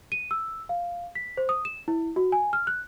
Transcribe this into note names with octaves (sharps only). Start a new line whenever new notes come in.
D#7
E6
F5
B6
C5
D#6
E7
E4
F#4
G#5
F6
F#6